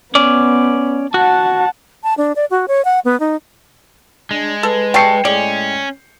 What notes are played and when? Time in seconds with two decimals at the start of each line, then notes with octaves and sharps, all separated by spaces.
0.15 B3 C#4 D5
1.14 F#4 F#5 A5
2.03 A5
2.18 D4
2.36 D5
2.51 F#4
2.68 C#5
2.85 F#5
3.05 B3
3.20 D#4
4.31 G#3 D4
4.63 A4 B4
4.94 G3 A4 G5 C#6 C7 C#7
5.25 A2 G#3 C#4 D5